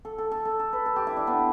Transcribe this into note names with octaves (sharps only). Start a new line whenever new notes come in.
A4
A4
A4
A4
A4
B4
A4
G4
E4
D4
B3